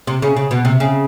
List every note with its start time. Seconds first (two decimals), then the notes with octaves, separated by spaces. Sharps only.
0.07 C3
0.22 C#3
0.37 C#3
0.51 B2
0.65 C3
0.80 C#3